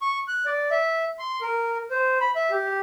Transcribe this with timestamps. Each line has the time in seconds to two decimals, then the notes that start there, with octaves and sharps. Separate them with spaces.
0.01 C#6
0.28 F#6
0.46 D5
0.71 E5
1.19 C6
1.41 A#4
1.91 C5
2.20 B5
2.36 E5
2.51 G4